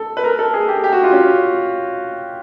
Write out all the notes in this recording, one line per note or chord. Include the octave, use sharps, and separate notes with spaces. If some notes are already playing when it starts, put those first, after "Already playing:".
Already playing: A4
B4
A#4
A4
G#4
G4
G4
F#4
F4
C#4